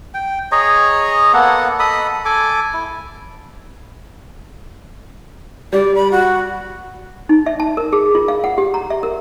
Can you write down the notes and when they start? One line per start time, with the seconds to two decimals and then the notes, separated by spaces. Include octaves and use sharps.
0.14 G5
0.52 G#4 C#5 D#5 A#5
1.34 A#3 B3 A4 F#5
1.79 A4 D#5 B5 D#6
2.25 A4 G#5 D6
2.74 E4
5.73 G3 D5
5.95 B5
6.12 F#4
7.29 D#4
7.46 E5
7.60 A5
7.77 A#4
7.93 G#4
8.15 F4
8.28 F5
8.44 F#5
8.58 G4
8.74 A#5
8.90 E5
9.03 A#4